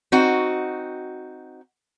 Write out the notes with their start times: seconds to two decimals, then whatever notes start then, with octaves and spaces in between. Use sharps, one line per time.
0.12 C4 D#4 F#4